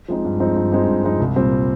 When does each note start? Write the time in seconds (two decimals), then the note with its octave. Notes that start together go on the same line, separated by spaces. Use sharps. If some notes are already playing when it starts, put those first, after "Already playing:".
0.08 F3 G#3 C4 D#4
0.25 G2
0.40 F3 G#3 C4 D#4
0.56 G2
0.72 F3 G#3 C4 D#4
0.87 G2
1.04 F3 G#3 C4 D#4
1.20 C2
1.36 A#2 G3 C4